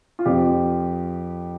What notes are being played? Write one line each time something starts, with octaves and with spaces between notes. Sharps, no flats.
F4
F2 F3 G4